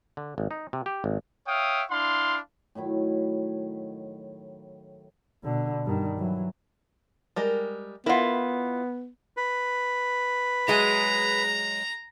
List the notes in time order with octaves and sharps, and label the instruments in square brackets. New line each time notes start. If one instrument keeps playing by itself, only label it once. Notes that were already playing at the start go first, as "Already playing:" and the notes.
[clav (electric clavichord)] D3
G#1
D#4
C3
G4
G#1
[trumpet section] C#5 E5 F5 G5 D#6
D4 E4 F5 C6
[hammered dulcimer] A2 D#3 F#3 E4
[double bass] B2 D3
G2 D#3
E3 F#3
[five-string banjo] G3 G#3 A#4
[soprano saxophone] B3 [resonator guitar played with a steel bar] E4 F4 [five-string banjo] A#4 F#5
[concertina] B4
[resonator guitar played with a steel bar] F#3 G#3 G#4 [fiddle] A#5